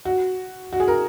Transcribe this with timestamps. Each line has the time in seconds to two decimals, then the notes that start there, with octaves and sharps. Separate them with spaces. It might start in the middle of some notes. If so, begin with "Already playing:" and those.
0.05 F#4
0.73 F#4
0.80 G#4
0.88 A#4